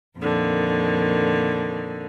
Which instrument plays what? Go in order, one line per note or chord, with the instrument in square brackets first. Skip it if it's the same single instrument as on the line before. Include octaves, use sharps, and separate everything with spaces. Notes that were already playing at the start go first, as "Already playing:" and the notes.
[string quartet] F2 A#2 D3 D#3